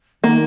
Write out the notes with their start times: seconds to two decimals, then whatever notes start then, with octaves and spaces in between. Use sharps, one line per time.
0.23 D#3 A#3